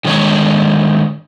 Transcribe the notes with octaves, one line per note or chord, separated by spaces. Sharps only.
D3 D#3 G#3 C#5